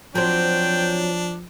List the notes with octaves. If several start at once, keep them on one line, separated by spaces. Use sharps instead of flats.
F3 F#3 C4 D4 G5